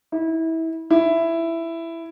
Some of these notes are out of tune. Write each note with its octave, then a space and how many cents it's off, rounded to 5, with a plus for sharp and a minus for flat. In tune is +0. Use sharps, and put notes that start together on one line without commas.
E4 -25
E4 +10